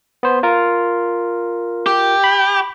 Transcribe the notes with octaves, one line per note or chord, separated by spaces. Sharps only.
B3 C5
F4 A#4
G4
B5